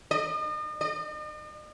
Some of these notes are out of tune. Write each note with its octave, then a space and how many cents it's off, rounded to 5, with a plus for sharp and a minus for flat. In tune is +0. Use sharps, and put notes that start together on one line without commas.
D#5 -40
D#5 -45